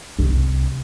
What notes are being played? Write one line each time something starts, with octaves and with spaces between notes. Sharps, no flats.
C2 C3